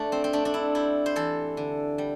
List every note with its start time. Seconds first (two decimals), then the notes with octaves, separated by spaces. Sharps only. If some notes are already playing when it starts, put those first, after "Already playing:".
Already playing: A3 D4
0.12 C4
0.24 C4
0.33 A3 D4
0.45 D4
0.54 E4
0.75 G3 E4
1.06 C5
1.16 E3 A4
1.57 D3
1.98 G3